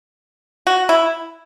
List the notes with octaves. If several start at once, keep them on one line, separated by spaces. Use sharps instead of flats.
F#4
E4